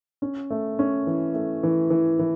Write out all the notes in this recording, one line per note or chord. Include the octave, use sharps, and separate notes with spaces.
C#4
A3
C#4
E3
A3
E3
E3
E3